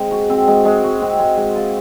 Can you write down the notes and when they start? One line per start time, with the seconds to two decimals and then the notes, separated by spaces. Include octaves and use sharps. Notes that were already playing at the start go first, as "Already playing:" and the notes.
Already playing: G#3 C4
0.11 F#4
0.30 C4
0.48 G#3
0.65 G#3
0.84 F#4
1.02 C4
1.19 G#3
1.37 G#3
1.55 F4